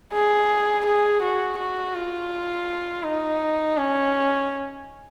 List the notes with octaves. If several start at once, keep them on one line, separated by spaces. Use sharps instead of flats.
G#4
G#4
F#4
F#4
F4
D#4
C#4